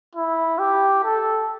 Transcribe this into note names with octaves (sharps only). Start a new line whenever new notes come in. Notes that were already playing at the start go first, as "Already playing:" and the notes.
E4
G4
A4